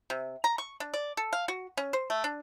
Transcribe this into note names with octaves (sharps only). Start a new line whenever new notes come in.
C3
A#5
C#6
D4
D5
A4
F5
F#4
C#4
C5
A3
D4